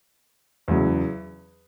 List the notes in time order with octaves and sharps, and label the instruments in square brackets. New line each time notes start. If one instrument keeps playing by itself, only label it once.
[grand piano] E2 C#3 F#3